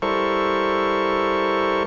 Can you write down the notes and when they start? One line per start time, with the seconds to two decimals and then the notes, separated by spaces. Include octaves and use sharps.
0.02 G3 E4 A4 A#4 C5 C#6